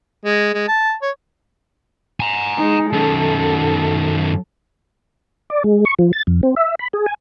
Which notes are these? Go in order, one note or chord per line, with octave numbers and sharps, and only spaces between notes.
G#3
G#3
A5
C#5
G#5 A#5
G#3 D#4
F#2 D#3 A4
D5
G#3
C#6
F3
A6
F2
C4
E5
B5
G#4
G#5